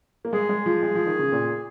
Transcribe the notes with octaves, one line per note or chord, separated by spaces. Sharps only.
A#3
G#3 G#4
G#3
F3
G#3
F3
D#3
C#3
A#2